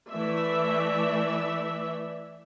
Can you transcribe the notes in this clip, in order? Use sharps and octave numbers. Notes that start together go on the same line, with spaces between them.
E3 A3 D5 E5